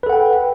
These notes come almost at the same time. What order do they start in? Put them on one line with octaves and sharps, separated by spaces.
B4 A4 F#5 G5